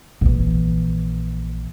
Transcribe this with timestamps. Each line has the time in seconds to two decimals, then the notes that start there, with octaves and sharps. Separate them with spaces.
0.21 A#1 E3